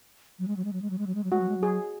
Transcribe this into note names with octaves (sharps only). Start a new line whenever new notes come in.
F#3
G#3
F#3
G#3
F#3
G#3
F#3
G#3
F#3
G#3
F#3
G#3 F#4
F#3
G#3
F#3
G#4